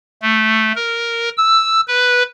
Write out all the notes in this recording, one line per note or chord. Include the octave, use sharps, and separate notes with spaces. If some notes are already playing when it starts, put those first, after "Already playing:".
A3
A#4
E6
B4